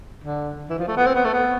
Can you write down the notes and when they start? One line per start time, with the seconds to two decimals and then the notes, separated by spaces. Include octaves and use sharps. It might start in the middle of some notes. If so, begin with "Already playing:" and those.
0.24 D3
0.70 E3
0.79 F3
0.88 A3
0.97 B3
1.06 C4
1.15 B3
1.24 A3
1.33 B3